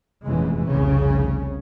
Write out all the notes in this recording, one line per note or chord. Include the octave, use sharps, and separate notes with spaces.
F1 A#1 E2 C#3 E3 G#3
F1 C2 C#3 C#4